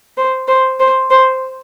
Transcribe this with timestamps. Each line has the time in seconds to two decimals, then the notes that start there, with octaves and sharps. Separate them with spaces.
0.17 C5
0.48 C5
0.80 C5
1.11 C5